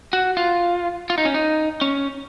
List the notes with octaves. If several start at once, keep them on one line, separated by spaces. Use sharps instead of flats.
F#4
F4
F4
D#4
C#4
D#4
C#4